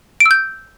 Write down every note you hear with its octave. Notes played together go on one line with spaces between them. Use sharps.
D7
E6
G6